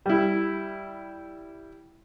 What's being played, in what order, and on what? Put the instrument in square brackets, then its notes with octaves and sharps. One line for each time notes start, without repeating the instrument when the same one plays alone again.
[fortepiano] G3 E4